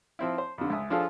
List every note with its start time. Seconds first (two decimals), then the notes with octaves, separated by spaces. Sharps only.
0.19 F3 C4 E4
0.38 C5
0.58 F2 D3
0.70 C#2 E5 D#6
0.90 F3 D4 F4 G#4 A4